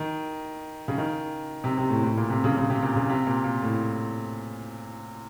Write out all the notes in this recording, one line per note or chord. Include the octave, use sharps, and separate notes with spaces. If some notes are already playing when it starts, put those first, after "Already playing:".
Already playing: D#3
C#3
D#3
C3
C3
A2
A2
A#2
C3
C#3
C#3
C3
A#2
C#3
C3
A#2
A#2
A2